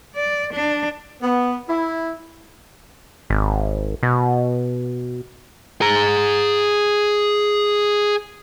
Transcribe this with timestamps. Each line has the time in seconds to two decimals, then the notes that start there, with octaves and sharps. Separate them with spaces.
0.16 D5
0.53 D4
1.22 B3
1.68 E4
3.30 G#1
4.03 B2
5.81 G#4 A#5